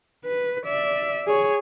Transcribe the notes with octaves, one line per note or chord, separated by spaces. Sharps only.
B4
D5 E5
G#4 C#5